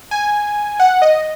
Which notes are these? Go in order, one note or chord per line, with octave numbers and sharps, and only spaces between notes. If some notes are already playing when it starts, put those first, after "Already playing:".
G#5
F#5
D#5